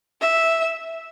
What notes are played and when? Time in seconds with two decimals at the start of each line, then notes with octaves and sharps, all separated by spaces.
0.21 E5